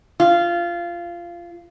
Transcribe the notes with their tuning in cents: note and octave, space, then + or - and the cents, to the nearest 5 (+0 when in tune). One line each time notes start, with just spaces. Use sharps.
F4 -15